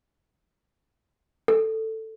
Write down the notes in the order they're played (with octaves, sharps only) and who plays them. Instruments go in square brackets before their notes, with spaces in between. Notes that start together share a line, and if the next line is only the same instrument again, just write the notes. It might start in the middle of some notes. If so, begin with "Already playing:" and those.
[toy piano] A4